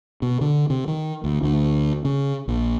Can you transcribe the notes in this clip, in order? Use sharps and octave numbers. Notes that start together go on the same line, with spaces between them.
B2
D3
C3
D#3
D2
D2
C#3
A#1